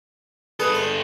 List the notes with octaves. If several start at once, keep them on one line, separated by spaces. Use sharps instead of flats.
G2 G#4 A4 B4
C5